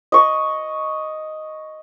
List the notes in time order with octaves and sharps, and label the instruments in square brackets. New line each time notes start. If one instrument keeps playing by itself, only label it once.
[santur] D#5 C#6